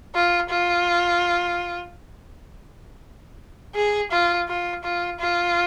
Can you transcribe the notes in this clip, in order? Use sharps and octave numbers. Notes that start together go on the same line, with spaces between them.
F4
F4
G#4
F4
F4
F4
F4